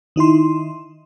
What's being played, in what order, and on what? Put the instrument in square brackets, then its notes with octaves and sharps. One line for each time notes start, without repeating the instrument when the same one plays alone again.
[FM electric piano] D#3 D#4 E4 C6